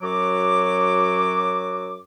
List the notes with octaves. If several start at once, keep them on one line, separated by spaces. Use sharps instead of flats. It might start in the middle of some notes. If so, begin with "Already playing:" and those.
F#2 F#3 F#4 D6